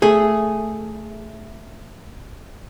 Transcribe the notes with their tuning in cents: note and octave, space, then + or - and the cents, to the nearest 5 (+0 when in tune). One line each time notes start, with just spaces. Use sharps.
A3 +0 G#4 +0